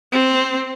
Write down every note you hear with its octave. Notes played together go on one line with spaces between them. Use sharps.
C4